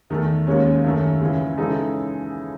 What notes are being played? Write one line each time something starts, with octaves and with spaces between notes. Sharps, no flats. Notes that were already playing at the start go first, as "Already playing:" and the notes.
E2 D#3 A3
D#2 D#3 G#3 C#4
F#2 D#3 A3
C#2 C#3 E3
C#3 E3 G#3 D#4 A4